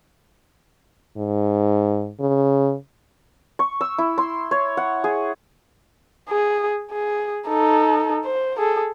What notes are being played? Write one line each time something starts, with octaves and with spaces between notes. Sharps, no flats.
G#2
C#3
C#6
E6
E4
C6
C#5
F#5
G#4
G#4
G#4
D#4 A4
C5
G#4 A4